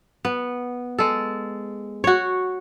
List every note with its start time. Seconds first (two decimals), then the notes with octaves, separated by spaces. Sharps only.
0.25 B3
0.99 G#3 A4
2.04 F#4 C#5